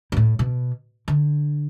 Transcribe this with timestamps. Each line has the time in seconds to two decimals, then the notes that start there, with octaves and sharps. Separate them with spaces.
0.12 G2
0.17 A2
0.39 B2
1.08 D3